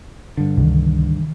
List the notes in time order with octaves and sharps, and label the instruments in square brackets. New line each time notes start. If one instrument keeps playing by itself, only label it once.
[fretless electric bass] G2 D3
[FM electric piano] C#2 [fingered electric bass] C3 D#3 E3